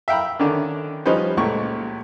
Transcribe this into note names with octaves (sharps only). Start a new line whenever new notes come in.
E5 F5 G5 A#5 B5
D3 D#3 C#4 D4
F3 G3 C#4 D#4 B4 C5
C#2 A#2 A3 C#6